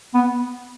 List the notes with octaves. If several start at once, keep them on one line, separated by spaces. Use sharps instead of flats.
B3